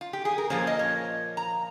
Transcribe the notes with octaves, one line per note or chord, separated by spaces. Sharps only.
F4
G4
G#4
A#4
A#2 F3 A#3 C#4 C5
D#5
C#5
A#5